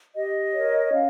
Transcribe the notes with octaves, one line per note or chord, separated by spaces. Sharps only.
G4 D#5
A#4 C#5
C#4 F5